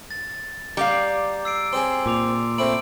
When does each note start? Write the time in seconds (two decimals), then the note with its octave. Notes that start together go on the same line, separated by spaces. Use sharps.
0.11 A6
0.77 G3 D5 F5 A#5 D6
1.45 E6 C7 D7
1.73 C4 G#4 C6
2.06 A#2 C6 D6 F7
2.58 A3 C4 B5 D7 F#7